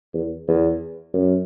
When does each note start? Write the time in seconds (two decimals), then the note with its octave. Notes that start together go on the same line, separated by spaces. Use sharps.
0.14 E2
0.48 E2
1.14 F#2